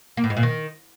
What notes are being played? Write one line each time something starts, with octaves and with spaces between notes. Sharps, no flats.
A#3
A2
G#2
A#2
D#3